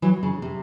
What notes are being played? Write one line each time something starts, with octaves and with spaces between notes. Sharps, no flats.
E3 F#3
C#3
C3